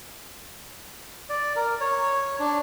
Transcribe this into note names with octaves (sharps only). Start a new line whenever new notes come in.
D5
A#4
C#5
D4